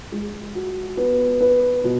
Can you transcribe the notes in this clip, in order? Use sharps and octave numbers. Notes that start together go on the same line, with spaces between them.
G#3
F#4
B3
B4
B2